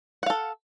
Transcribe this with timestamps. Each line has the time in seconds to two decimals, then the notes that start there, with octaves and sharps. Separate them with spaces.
0.23 F#5
0.26 F5
0.30 A4